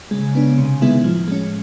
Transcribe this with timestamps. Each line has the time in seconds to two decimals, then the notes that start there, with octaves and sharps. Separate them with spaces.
0.11 C#3 G#3
0.35 B3 D4
0.58 C3
0.82 D#3 G#3 B3 E4
1.04 A2 F3
1.28 G#3 C#4